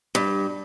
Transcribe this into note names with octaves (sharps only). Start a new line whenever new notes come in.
G2